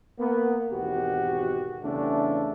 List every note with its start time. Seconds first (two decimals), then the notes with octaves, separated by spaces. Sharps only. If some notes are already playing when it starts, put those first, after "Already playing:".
0.19 A#3 B3
0.71 G#1 E2 B2 F#4 G4
1.82 E2 C#3 A3 D4